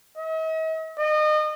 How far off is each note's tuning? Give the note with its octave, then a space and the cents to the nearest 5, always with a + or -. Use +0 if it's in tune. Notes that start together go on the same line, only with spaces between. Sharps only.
D#5 +45
D#5 -30